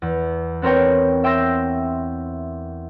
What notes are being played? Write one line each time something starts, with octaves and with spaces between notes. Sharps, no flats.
E2
B3 C4 A#4 C#5 G5
E5 G5 C6 E6 G6 A#6